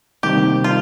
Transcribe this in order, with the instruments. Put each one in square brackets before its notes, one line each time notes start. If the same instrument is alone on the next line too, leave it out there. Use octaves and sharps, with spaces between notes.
[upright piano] C3 D#3 G3 A#3 D#4 [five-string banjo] G4
[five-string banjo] F4